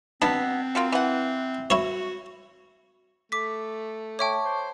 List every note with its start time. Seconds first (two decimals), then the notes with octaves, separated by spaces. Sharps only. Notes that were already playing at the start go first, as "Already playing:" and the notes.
0.22 B2 B3 C4 D4
0.75 A#3 F4 F#4
0.92 E3 F#5
1.70 E4 F#4 C#5
3.32 A3 D6 B6
4.19 C#5 E5 G5 A5 C#6 D6
4.45 C5